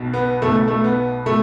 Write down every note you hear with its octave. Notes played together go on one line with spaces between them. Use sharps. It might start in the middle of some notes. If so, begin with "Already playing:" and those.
Already playing: B1 B2
B3
B1 B2 A3
A3
B3
B2 A3